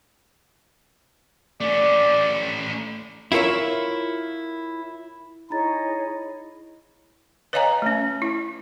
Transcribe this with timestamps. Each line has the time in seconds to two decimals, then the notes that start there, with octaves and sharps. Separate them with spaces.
1.61 A3 C#4 D5
3.32 E4 F4 A#4 C#5 E5
5.50 D#4 E4 G#4 C#5 D#5 A#5 A6
7.53 B4 C#5 D#5 F5 G#5 A#5
7.82 A3 C#4
8.22 E4